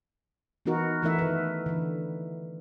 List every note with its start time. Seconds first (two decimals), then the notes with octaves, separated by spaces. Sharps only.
0.66 E3 B3 D#4 F#4 A#4
1.02 E3 A3 D#4 E4 A#4 E5
1.19 D#3 B4
1.66 D3 E3